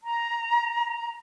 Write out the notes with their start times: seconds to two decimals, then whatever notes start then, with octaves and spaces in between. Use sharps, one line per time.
0.01 A#5